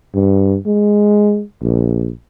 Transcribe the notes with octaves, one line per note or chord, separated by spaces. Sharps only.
G2
G#3
A#1